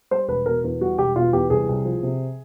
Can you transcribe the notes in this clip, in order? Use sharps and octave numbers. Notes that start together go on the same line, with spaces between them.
G3 C5
E1 B4
B2 A#4
E2
G3 F#4
E1 G4
B2 F4
E2 G4
C2 G#4
C2
F3
C3